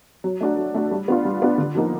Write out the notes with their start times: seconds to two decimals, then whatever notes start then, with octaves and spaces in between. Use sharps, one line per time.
0.24 F#3
0.41 A3 D4 F#4
0.57 F#3
0.75 A3 D4 F#4
0.91 G3
1.08 B3 D4 F4
1.25 G3
1.42 B3 D4 F4
1.58 D3
1.75 F3 A#3 D#4